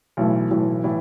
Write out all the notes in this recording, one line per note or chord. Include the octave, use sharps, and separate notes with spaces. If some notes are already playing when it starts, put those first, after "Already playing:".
B1 A2 E3 A3
B1 A2 E3 A3
A2 E3